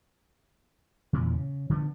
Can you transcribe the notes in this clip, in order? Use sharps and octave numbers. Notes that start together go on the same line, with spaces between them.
E2 A#2 C#3 E3
C#3
D3 F3 B3